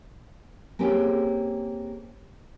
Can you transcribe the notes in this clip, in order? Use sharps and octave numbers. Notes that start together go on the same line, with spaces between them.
A#3 C4 C#4 G4 G#4